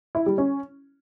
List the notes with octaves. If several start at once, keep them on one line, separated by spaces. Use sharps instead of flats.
E4
G3
C#4